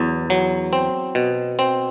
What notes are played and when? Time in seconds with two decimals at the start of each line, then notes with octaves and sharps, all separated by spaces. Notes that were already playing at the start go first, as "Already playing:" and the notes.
Already playing: E2 F#3
0.30 F#3
0.73 C4
1.15 B2
1.59 C4